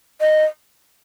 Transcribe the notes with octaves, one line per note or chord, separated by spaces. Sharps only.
D#5